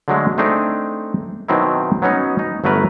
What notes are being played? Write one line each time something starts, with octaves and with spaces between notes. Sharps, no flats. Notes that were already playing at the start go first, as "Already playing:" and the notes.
D3 F#3 G#3 A3
A3 C4 D4 D#4 G#4
B2 D#3 F#3 C4 D#4 E4
F#3 B3 C#4 D#4
D#4
G1 F#3 A3 A#4 B4 A#5